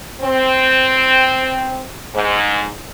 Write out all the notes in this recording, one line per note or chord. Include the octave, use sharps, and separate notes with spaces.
C4
G#2